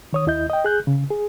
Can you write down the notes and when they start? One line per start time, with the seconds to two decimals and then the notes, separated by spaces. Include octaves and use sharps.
0.13 D#3 C#5 D#6
0.27 D#2 E4 D#5 G6
0.50 D#5 G5
0.65 G#4 F#6 G6
0.87 C#3
1.11 G#4